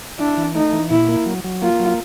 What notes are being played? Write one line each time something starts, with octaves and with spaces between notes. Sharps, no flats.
D4 E4
E3
A3 D#4
E3
A#2 E4
A#3
F#3
F#3
A#3 F4
F#3